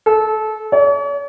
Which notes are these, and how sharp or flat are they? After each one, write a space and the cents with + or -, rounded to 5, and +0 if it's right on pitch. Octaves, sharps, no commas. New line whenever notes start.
A4 -25
C#5 +45